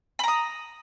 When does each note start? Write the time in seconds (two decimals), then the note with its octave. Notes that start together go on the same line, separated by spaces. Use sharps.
0.19 B5
0.24 A#5
0.28 D#6